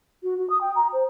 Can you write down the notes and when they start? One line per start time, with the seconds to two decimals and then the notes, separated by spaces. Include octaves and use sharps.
0.23 F#4
0.38 F#4
0.49 D#6
0.60 G5
0.75 A#5
0.92 C5